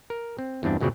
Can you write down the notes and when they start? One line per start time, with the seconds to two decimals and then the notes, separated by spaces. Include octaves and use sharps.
0.10 A#4
0.38 C4
0.63 E2 G2 C4 D4
0.81 F#2 A#2 C#3 F#3 C4 D5